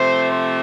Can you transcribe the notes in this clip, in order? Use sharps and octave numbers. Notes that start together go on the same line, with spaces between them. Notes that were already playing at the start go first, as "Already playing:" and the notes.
Already playing: C3 F3 A3 C5
C5